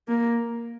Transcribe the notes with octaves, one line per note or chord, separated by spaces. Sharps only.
A#3